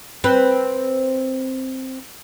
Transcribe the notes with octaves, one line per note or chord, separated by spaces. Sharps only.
C4 B4